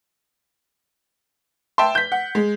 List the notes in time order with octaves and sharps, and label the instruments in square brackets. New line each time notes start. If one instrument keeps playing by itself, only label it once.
[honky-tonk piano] E5 G5 A5 C6
G6 B6
F#5
G#3